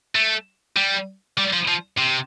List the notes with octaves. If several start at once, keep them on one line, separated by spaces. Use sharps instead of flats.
A3
G3
G3
F3
F3
C3